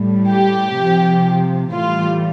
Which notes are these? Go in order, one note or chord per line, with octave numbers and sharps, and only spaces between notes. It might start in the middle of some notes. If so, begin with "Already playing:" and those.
Already playing: A2 G3
G4
C3 F3
A2 E3 G3 F4